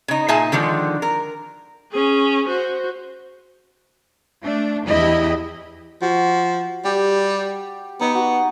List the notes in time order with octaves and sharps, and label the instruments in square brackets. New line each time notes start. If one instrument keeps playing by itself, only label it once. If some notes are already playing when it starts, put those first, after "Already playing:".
[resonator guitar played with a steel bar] C#3 D#4
A#2 D#4 G#4 E5 G#5 A5
D3 D#3 F3 G#3
A#4
[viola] C#4 G#4
F#4 C5
[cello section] A3 D4
E2 E4 G4 D#5
[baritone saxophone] F3 [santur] F#4
[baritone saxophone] G3 [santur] G4
[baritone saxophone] B3 [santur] D#4
[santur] F#4